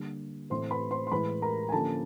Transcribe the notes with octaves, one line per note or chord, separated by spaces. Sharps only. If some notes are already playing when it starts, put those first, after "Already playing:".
Already playing: D3 G3 A#3
A2 E3 A3 C4 C5 C6
B4 B5
C5 C6
C6
A2 E3 G#3 B4 B5
A#4 A#5
G#5
D3 F3 A#3 C#4 A4 A5